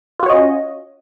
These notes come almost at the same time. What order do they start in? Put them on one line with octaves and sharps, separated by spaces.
F4 F#4 C#5 D#5 C#4